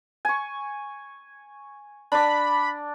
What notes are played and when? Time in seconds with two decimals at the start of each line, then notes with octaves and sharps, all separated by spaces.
0.25 G#5 C#6
2.12 D4 D5 B5